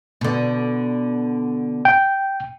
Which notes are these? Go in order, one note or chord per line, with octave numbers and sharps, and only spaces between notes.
B2 D3
G5